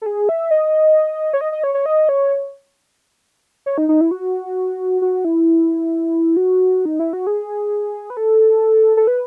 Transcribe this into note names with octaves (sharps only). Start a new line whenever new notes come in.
A4
G#4
E5
D#5
C#5
D#5
D#5
C#5
C#5
D#5
C#5
C#5
D#4
D#4
E4
F#4
F#4
E4
F#4
D#4
E4
F#4
G#4
B4
A4
A4
B4